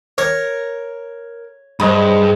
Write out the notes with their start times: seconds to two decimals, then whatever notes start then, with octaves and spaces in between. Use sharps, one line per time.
0.18 A#4 C#5
1.80 G2 G#4 C5 D#5 B5